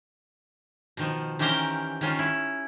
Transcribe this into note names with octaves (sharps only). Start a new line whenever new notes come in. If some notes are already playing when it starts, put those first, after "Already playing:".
B2 D#3 F3
D#3 E3 C#4 G4 A#4 C5
D#3 C#4 F4
E4